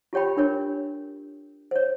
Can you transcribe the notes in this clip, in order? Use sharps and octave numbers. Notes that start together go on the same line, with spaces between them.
F4 G4 C#5 G5 B5
D4 A#4 C#5
C5 C#5